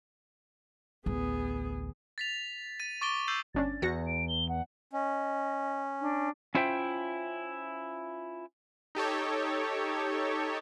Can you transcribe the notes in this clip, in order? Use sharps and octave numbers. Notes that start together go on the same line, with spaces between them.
A1 D2 B3 G#4
A6 B6 F7
A6 D#7
C#6 D6 A6 D7 G7
E6 G6 A6 C7 D#7 F#7
G1 C#4 D4 A6
E2 F#4 A#6 C#7
D7
G7
F#5
C#4 D#5
D4
C#4 E4 F4 C5 E5 G5
D#4 G4 A4 C#5